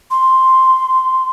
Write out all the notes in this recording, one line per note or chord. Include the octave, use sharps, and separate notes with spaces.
C6